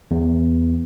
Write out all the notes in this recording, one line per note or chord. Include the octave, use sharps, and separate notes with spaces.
E2